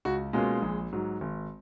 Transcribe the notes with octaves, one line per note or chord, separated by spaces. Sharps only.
C#2 F#4
B2 G#3 A#3 C#4 F4 G#4
A#1
G#2 F#3
G#1